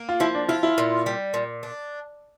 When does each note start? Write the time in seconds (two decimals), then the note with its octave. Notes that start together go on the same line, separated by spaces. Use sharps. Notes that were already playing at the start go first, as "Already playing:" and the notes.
Already playing: A#3
0.09 F4
0.20 F3 E4
0.35 D4
0.48 E4 F4
0.63 E4
0.78 A#2
1.06 G3
1.34 A#2
1.63 D4